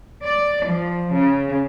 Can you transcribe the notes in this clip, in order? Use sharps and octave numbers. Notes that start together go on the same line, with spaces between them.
D5
F3
C#3